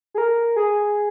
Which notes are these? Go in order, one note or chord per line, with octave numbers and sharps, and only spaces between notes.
G#4
A#4
G#4